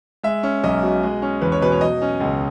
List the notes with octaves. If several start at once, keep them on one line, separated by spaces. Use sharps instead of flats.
G#3 E5
C#4
B1 D#5
B2
G#3
C#4
E2 B4
C#5
B2 B4
C#5
F#3 D#5
C#4
C#2